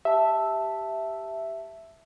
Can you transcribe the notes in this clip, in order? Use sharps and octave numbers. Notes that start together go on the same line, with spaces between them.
G4 E5 A5